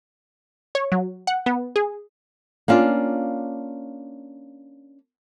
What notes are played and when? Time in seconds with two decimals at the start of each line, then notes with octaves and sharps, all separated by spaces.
0.75 C#5
0.92 F#3
1.27 F#5
1.46 B3
1.76 G#4
2.68 A#3 C#4 D4 F4